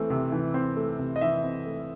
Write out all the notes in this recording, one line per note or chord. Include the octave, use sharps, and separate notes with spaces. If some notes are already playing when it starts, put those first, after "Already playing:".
Already playing: E3 A3 C4
C3
E3
C4
A3
C3
D#5
E3 E5
C4
A3